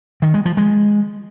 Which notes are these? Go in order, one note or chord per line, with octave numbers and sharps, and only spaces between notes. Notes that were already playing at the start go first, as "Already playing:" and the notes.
D#3
G#3
F3
G#3